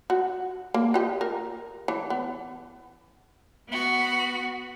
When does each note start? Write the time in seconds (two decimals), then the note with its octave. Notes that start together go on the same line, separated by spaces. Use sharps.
0.10 F#4
0.74 A#3
0.94 F4 G4 D#5
1.21 A#4
1.88 E3 C#5
2.10 B3
3.68 B3 F#4